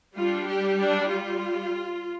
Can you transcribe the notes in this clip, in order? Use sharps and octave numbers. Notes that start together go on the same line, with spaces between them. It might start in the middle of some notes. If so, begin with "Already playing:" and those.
G3 D4 F4
G4
D4
F4